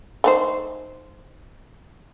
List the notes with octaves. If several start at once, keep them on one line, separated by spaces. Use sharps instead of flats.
A3 D#4 C5